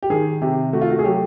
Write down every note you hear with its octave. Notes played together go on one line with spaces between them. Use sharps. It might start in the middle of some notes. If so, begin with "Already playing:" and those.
G4
D#3 G#4
C3 G4
A3 F#4
F4
F#4
G#4
F#3 G4